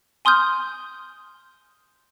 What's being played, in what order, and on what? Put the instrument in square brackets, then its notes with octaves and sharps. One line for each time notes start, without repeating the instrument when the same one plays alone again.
[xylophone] G#5 C6 D#6 F6 G6